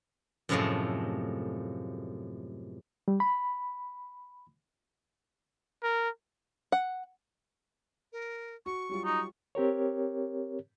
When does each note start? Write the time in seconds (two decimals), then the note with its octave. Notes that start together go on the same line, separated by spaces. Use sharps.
0.49 F#2 A2 C3 F3 G#3 A3
3.08 G3
3.20 B5
5.83 A#4
6.72 F#5
8.12 A#4
8.66 F#4 C#6
8.89 F#3 G3 F4
9.05 D#4 C#6
9.55 C4 G4 A#4 C#5